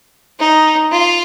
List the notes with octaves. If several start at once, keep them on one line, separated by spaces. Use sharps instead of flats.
D#4
F4